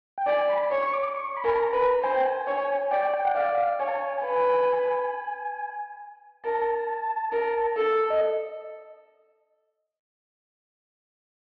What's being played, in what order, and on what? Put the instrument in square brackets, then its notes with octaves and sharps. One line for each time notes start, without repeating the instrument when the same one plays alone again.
[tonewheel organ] G5
[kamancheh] D5 [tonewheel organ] G#5
[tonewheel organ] B5
[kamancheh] C#5
[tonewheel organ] C#6
D6
C#6
B5
[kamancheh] A#4 [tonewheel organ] G#5
[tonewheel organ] A5
A#5
[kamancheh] B4
[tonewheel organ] A#5
[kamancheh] C5 [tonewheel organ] G#5
[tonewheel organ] G5
G#5
[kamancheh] C#5 [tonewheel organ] G#5
[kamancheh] D5 [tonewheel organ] G5
[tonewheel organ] G5
F#5
[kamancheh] D5 [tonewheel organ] F5
[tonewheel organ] F5
[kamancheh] C#5 [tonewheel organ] G#5
[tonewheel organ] A5
G#5
[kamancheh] B4
[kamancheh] A#4 [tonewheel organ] A5
[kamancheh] A#4
A4
[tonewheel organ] D#5